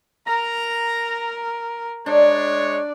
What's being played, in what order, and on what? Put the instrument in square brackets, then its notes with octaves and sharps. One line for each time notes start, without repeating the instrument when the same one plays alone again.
[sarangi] A#4 [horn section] A#5
[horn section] G#3 C#5 [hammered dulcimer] D4 [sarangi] D5